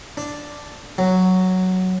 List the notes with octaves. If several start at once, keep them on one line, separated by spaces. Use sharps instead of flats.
D4
F#3